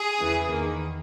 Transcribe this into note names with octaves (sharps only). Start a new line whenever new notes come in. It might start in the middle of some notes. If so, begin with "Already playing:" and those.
Already playing: G#4
E2 C#3 E3
E2 D#3 A#3